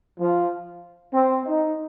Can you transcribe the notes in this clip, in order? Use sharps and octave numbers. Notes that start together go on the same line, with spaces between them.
F3
C4
D#4